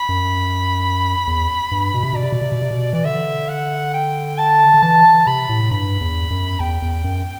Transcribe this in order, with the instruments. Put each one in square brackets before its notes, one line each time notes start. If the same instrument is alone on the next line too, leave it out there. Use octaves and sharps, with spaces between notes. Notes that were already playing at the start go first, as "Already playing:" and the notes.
Already playing: [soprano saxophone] B5
[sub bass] F#2
E2
G2
B2
C3
[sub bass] B2 [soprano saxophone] D5
[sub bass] C3
B2
C3
B2
C3
B2
[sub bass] E3 [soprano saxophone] D5
[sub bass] D3 [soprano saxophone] E5
[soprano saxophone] F#5
G5
A5
[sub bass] D3
[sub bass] E3 [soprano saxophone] A5
[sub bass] C3 [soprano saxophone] B5
[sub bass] A2
[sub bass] G2 [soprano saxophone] B5
[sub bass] E2
F#2
[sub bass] E2 [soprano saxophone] G5
[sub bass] E2
F#2